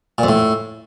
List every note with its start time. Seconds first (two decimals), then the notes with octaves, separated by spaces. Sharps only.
0.18 A#2
0.23 F2
0.28 A2